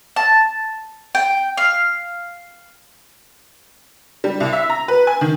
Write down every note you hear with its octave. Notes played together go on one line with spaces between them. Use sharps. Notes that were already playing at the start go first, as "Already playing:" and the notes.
A5
G5
F5
G3
C2
E5
A#5
B4
G#5
D#3